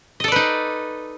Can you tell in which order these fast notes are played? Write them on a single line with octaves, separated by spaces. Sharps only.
D#5 A4 D5 B4 D#4